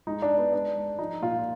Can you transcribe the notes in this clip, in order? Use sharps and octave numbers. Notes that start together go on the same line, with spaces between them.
G#3 D#4
D4
G#3
B3
G#3 D4
G#3
F3 D#4
A#2 F4